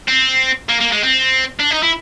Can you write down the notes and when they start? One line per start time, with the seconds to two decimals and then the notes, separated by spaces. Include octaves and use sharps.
0.08 C4
0.69 A#3
0.80 A#3
0.92 G#3
1.03 C4
1.60 D4
1.71 D#4
1.83 E4